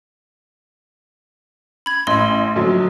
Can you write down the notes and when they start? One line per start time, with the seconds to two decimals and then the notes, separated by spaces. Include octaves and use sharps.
1.86 B5 G#6
2.07 A1 D#5 C6
2.56 A#1 D3 F#3